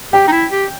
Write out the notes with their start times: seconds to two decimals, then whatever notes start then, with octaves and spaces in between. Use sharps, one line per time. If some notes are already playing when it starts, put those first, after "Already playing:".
0.13 G4 G5
0.28 D#4
0.32 E4
0.51 G4